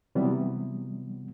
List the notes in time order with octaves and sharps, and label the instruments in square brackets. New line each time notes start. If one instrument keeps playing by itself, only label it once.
[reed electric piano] C3 E3 F#3 G3 B3